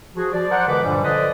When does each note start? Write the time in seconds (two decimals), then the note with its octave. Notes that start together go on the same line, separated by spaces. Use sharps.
0.16 F3 F#4 G#4
0.32 F3 D5
0.50 A#4 C5 D5 F#5
0.67 C#2 D3 E3 B3 B4 D6
0.82 G2 A#2 D3 E3 F3 G3
1.01 D3 F3 B4 C5 D5 D#5